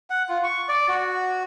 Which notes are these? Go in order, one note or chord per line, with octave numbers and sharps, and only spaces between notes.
F#5
F4
C#6
D5
F#4